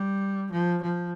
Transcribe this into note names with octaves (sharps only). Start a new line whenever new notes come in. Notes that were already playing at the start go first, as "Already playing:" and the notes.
Already playing: G3
F3
F3